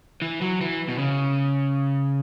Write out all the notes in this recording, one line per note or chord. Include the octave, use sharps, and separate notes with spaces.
E3
F#3
E3
B2
C#3